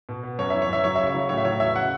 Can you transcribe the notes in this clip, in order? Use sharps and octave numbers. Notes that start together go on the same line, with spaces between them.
B2
B3
F#2 C#5
E3 E5
C#5
F#2 E5
F#3 C#5
C#3 E5
C#5
F#3
A2 C#5
E5
F#3 C#5
E2 E5
C#3 F#5